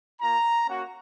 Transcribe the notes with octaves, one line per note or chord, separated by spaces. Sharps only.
A#3 F4 A#5
A#3 C#4 F#4